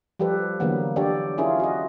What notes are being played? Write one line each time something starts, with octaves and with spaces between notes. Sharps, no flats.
F3 G3 G4 A4 B4
D3 E3 F#3 A#3 B3
D4 G4 A4 C#5 D5
C#4 E4 F4 G#4 A#4
F#4 D#5